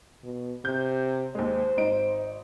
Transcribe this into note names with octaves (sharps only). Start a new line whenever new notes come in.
B2
C3 G6
D#2 G#3 C5
G#1 D#4 D7